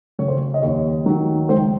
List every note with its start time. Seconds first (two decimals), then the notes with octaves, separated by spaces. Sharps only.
0.19 C#3 F#3 C#5
0.28 C5
0.36 C#5
0.54 D#5
0.62 D#2 C#5
1.06 D#3 F#3
1.49 C#2 C5